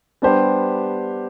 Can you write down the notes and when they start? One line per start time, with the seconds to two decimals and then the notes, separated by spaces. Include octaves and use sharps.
0.22 G3 B3 D4 G4 C5